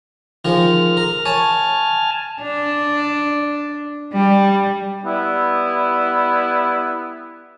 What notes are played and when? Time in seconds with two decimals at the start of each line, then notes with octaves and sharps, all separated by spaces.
0.45 D#3 F3 G#3 F6
0.97 A#4
1.25 C#5 G#5 A5 F6
2.41 D4
4.13 G3
5.06 G3 B3 E4